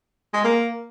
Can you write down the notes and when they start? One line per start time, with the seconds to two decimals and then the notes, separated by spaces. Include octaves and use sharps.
0.33 G#3
0.44 A#3